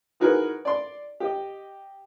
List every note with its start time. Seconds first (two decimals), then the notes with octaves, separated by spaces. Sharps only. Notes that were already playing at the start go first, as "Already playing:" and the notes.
0.20 E3 D#4 F#4 G#4 A#4 B4
0.65 D5 C6
1.20 G4 D#5